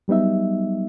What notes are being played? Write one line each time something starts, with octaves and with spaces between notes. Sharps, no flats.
F#3 G3 B3 D#4 E5